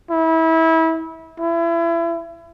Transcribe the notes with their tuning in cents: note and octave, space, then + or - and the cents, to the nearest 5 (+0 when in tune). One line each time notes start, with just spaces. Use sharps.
E4 -25
E4 +30